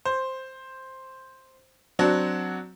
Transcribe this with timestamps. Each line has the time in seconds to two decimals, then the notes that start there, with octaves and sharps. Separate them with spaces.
0.05 C5
1.99 F#3 C4 D4 F#4